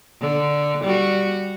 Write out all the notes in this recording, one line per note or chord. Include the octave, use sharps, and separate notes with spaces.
D3
G3 F#4